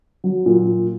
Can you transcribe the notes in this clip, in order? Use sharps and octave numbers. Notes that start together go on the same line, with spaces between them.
F#3
A#2